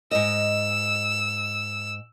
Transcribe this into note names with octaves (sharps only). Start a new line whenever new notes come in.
G#2 D#5 E6